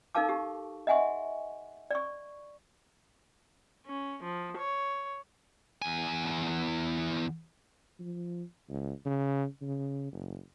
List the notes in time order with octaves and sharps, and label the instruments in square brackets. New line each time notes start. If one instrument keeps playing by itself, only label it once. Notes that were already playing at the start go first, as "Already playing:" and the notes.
[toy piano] D#4 A4 A#4 F5 A5 D6
G4 C#6
D#5 E5 F#5 G#5 C6 C#6
D5 C#6
[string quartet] C#4
F3
C#5
[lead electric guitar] E2 G#5
[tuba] F3
C#2
C#3
C#3
F#1